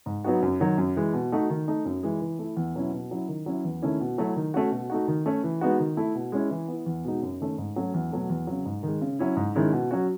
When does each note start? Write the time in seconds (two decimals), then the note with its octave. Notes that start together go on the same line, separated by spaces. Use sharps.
0.06 G#2
0.24 F#3 B3 D#4 F#4
0.42 F#2
0.60 D#3 F#3
0.78 F#2
0.96 E3 G#3
1.13 B2
1.32 A3 D#4 F#4
1.50 D#3
1.68 A3 D#4
1.85 F#2
2.03 E3 G#3
2.21 E3
2.39 A3 E4
2.57 E2
2.75 B2 F#3 C#4 E4
2.93 B2
3.11 F#3 C#4 E4
3.28 D#3
3.46 F#3 C#4 E4
3.65 E2
3.82 D#3 A3 C#4 E4
4.00 B2
4.18 F#3 A3 E4
4.36 D#3
4.54 A3 C#4 F#4
4.71 B2
4.90 A3 D#4 F#4
5.08 D#3
5.26 A3 C#4
5.44 E3
5.61 G#3 B3 D#4 F#4
5.79 D#3
5.97 A3 E4
6.15 B2
6.32 G#3 C#4 E4
6.50 E3
6.68 B3 E4
6.86 E2
7.05 B2 G#3 D#4
7.22 F#2
7.40 D#3 A3 C#4
7.58 G#2
7.76 F#3 A3 C#4 F#4
7.94 E2
8.12 B2 F#3 A3
8.30 E2
8.47 C#3 F#3
8.66 G#2
8.83 D#3 G#3
9.01 C#3
9.19 F#3 C#4 E4
9.36 G#2
9.55 D#3 G#3 C#4 E4
9.73 B2
9.91 F#3 C#4 F#4